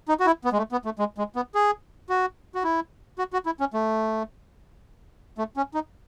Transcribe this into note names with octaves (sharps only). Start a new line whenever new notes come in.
D#4
F#4
E4
B3
G#3
A3
B3
A3
G#3
G#3
B3
G#4
F#4
F#4
E4
F#4
F#4
E4
C#4
A3
A3
C#4
D#4